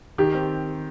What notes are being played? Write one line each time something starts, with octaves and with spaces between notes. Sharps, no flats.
D#3 G4
C4